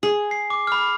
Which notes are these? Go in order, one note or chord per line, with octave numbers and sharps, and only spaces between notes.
G#4
C7
D6
B5 F6